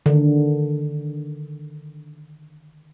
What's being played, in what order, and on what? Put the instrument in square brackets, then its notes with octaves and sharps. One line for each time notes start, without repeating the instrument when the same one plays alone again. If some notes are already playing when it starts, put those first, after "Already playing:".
[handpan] D3 D#3